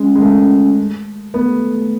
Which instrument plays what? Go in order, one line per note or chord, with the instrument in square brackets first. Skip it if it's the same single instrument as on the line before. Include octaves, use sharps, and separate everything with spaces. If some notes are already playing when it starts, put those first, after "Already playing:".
Already playing: [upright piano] G#3 [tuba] C#4
[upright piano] G#3
A3
[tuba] A3 [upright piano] B3